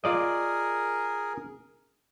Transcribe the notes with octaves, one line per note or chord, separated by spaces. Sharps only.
F4 G#4 A#4 D5 D#5